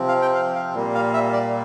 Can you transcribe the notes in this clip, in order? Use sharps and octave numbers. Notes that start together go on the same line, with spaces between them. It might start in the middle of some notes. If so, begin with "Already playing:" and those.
Already playing: C3 F3 C4
F5
G5
F5
F5
A#2 G3 A#3
F5
E5
D5